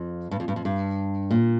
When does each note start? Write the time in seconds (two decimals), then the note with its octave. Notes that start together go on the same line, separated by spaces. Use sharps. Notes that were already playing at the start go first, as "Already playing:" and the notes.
Already playing: F2
0.31 G2
0.40 F2
0.48 G2
0.56 F2
0.65 G2
1.31 A#2